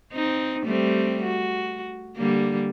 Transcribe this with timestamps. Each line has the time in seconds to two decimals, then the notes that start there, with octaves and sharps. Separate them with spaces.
0.13 C4 D#4
0.64 G3 A3 C4
1.23 F#4
2.17 D3 G3 A#3